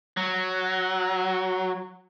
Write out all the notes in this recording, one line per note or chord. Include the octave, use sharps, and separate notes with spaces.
F#3